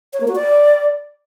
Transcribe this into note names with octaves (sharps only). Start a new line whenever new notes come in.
C#5
A#3
F#4
D5